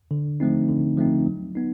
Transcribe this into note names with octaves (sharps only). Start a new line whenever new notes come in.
D3
F3 A3 C4 D#4
D3
F3 A3 C4 D#4
F#3
B3 D#4